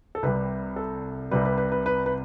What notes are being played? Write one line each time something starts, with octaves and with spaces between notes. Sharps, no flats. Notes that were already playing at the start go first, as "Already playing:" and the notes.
A4
C2 C3 G3 B4
A4
C2 C3 G3 B4
B4
B4
B4
B4
B4